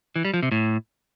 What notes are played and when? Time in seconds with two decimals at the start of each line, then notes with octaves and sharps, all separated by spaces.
0.16 E3
0.25 G3
0.34 F3
0.43 C3
0.51 A2